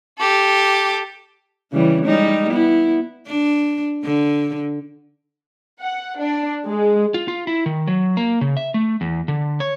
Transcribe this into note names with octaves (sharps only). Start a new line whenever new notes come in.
G4 A4
C#3 E3 G3
G3 G#3 D#4
B3 E4
D4
D3
F#5
D4
G#3
F4
F4
E4
D#3
F#3
A#3
C#3
E5
A3
E2
D3
C#5